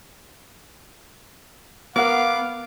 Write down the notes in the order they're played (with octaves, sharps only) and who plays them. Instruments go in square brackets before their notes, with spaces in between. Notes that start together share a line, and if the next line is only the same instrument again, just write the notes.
[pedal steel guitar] B3 [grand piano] A#4 F#5 [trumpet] F5 [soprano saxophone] D6